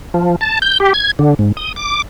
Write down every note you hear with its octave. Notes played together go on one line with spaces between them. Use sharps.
F3
A5
G6
G4
G#6
D3
G#2
D#6
D6